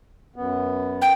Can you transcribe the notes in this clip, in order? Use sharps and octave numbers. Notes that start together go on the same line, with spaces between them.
F#2 B3
G5